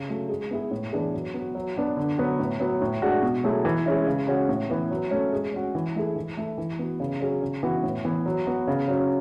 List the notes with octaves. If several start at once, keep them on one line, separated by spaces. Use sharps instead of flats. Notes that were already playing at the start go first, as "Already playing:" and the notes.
Already playing: C#3
F#3 A3
G#3
B3 E4 G#4
A2
E3 B3 D4 G#4
F#3
B3 F#4
F#3
B3 D4 F#4
D3
F#3 B3 F#4
A2
F#3 B3
A2
G#3 D4 F#4
B2
F#3 A3 E4 G#4
E3
G#3 C#4 E4
C#3
G#3 C#4 F#4
A2
E3 B3
F#3
A3 C#4
G#3
C#4 F#4
E3
A3 E4 G#4
E3
A3 E4
E3
B3 F#4
C#3
F#3 C#4 G#4
C#3
E3 B3 F#4
A2
E3 B3
F#3
B3 F#4
C#3
F#3 C#4